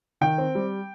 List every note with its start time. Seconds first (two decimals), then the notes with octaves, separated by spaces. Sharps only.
0.21 D#3 G5
0.38 C4
0.55 G3